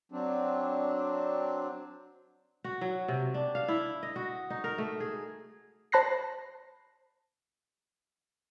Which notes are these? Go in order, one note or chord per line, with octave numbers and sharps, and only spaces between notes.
F#3 C4 D4
F#4
F#3
C3
D4
F5
E4
D#5
F#4
D#4
A#4
A3
G#4
C5 A5 B5 F#6 A#6 C7